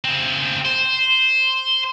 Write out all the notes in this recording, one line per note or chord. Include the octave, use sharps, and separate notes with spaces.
C#3 C4
C5